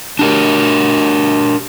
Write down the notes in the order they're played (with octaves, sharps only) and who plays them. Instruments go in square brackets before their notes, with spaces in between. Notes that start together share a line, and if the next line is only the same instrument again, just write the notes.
[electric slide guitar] D4 G4 A#4